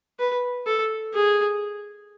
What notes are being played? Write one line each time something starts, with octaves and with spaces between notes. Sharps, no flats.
B4
A4
G#4